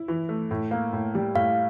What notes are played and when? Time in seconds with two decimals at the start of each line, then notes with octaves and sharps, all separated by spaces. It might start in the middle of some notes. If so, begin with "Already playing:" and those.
Already playing: E4
0.08 E3
0.29 A3
0.51 A2
0.71 A#3
0.93 A2
1.15 G3
1.35 A2 F5